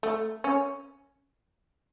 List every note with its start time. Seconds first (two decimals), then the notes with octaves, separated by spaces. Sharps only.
0.03 A3
0.44 C#4